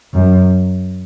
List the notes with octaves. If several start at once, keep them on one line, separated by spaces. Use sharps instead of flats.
F#2